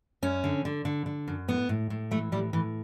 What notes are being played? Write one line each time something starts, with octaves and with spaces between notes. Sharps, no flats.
F#2 C#4
D3
D3
D3
D3
F#2
A2 B3
A2
A2
E3 A3
A2 G3
A2 E3